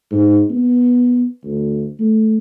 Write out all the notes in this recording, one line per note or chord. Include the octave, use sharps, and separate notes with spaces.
G#2
B3
D2
A3